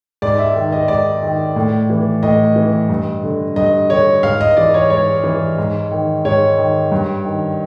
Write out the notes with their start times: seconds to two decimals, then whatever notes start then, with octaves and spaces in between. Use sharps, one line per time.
0.22 G#2 D5
0.38 E5
0.55 D#3
0.72 D#5
0.88 G#2 D5
1.23 D#3
1.56 A2
1.90 E3
2.23 A2 D#5
2.56 E3
2.89 G2
3.23 D3
3.56 G2 D#5
3.90 D3 C#5
4.23 G#2 F5
4.41 D#5
4.57 E3 D5
4.74 C#5
4.90 G#2 C#5
5.24 E3
5.58 G#2
5.91 D#3
6.25 G#2 C#5
6.58 D#3
6.92 G2
7.25 D#3